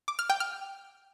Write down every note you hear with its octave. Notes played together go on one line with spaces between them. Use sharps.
D6
F6
G5
F6